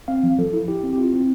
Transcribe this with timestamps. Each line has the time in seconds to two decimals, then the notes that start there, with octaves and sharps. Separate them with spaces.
0.08 C4 F5
0.23 F3
0.39 F3 A4
0.53 E4
0.68 E4 G4
0.84 C4
0.93 G4
0.98 E4 F4
1.14 C4